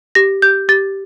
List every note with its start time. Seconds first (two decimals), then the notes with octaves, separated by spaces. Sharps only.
0.15 G4 A#6
0.42 G4 G6
0.69 G4 A6